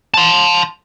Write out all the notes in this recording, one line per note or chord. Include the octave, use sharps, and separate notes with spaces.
A5 C6